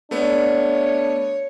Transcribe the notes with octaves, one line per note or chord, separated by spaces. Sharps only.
A3 B3 D4 C#5